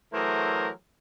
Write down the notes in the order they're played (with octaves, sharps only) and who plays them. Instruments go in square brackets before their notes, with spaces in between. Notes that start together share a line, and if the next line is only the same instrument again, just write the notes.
[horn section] E3 F#3 A3 G#4 A#4 C5